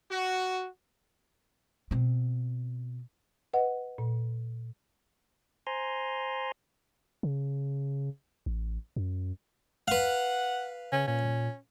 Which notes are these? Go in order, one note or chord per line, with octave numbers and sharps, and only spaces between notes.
F#4
B2 C4
B4 D#5 F#5
A#2
C5 G#5 A#5 C6
C#3
A1
F#2
B4 F5 F#5
C#3 C#4
A#2 C#4